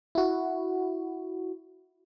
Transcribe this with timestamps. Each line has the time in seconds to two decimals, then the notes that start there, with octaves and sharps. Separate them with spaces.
0.15 E4 F#4